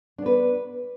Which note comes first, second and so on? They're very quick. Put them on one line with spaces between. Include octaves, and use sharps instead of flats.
D4 B3 B4